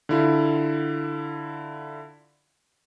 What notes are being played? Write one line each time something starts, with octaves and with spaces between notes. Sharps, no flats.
D3 E4 F4